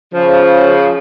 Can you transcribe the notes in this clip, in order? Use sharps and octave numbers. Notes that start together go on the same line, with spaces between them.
C#3 F3